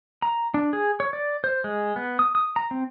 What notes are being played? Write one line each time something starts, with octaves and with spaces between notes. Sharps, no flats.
A#5
D4
G#4
C#5
D5
C5
G#3
B3
D#6
D#6
A#5
C4